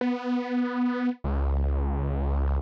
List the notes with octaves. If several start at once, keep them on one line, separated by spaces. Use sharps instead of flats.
B3
C#2